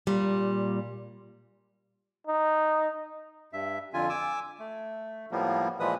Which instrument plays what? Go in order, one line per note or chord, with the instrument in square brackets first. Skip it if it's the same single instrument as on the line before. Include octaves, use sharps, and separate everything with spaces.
[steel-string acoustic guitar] A#2 G3
[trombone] D#4
[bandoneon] G2 E5
F2 D3 F4 G#5
G#5 D6 E6
A3
A2 F3 G3 A#3 B3
A#2 E3 F3 G#3 B4 D#6